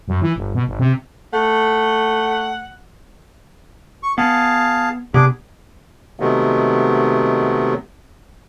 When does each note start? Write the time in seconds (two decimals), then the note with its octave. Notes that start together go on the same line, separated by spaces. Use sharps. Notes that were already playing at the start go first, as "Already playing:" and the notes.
0.08 F#2
0.22 E3
0.36 G1
0.55 B2
0.67 G#1
0.79 C3
1.33 A3 F#5
4.03 C#6
4.18 B3 G#4 F5 A5
5.14 C3 B3 D4 G#4 D6
6.20 C3 D#3 F#3 G#3 A3 B3